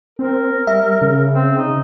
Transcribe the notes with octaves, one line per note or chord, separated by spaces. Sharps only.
C4 A#4
G3 E5
C#3
C4
D#4